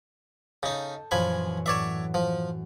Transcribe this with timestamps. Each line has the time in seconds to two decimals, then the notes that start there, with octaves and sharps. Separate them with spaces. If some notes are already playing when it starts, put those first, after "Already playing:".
0.63 C#3 D#4 A4 G6
1.11 F#2 A#2 E3 F3 G#5 B5
1.66 A2 C#5 D5 E5 F#5 E7
2.14 F3